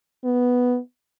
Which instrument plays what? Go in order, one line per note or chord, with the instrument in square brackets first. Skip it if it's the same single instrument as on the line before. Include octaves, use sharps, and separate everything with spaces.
[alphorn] B3